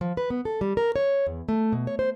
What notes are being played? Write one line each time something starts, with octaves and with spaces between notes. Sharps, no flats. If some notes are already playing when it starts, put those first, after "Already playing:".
F3
B4
B3
A4
G3
A#4
C#5
E2
A3
B2
C#5
C5